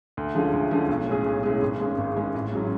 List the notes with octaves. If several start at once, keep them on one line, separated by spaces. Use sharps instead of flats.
D2
D3 F3 G#3 C#4
D2
D3 F3 G#3 C#4
B1
A2 G#3 C#4 G#4
B1
A2 G#3 C#4 G#4
G#1
G#2 G#3 C#4
G#1
G#2 G#3 C#4
A1
G#2 F#3 C#4